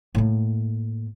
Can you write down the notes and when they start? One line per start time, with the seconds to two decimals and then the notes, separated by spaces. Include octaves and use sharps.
0.15 A2 A#3